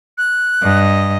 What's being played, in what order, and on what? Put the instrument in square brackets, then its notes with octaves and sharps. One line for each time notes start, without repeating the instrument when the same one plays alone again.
[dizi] F#6
[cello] G2 D#5